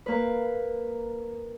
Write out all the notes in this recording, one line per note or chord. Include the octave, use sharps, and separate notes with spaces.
A#3 B4